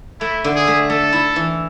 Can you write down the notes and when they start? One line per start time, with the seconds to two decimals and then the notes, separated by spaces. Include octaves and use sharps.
0.21 A3 E4
0.44 D3
0.56 G#4
0.67 A3
0.90 A3 A4
1.13 E4
1.36 E3